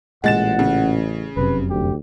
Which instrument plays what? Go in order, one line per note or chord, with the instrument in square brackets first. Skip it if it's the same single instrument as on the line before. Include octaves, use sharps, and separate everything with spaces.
[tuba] A1 [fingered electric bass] A#2 [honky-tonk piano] G#3 A6 E7 [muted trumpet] F#5
[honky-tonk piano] C#3
[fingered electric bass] F1 F#2 C3 [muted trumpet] B4
[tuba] D2 [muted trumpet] G4